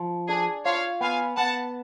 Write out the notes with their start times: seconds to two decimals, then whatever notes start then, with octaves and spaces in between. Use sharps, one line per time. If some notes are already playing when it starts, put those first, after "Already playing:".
Already playing: F3
0.28 D4 G#4
0.65 F4 C#5 F5
1.01 B3 F5 G#5
1.37 B3 F#5 A5